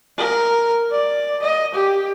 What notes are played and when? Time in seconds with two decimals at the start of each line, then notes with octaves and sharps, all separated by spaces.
0.18 A#4
0.91 D5
1.42 D#5
1.74 G4